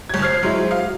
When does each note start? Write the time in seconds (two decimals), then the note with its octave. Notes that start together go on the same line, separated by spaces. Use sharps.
0.09 G1 G#6
0.22 C5 F6 G#6 C7
0.43 F#3 G#3 E4
0.71 F#4 F5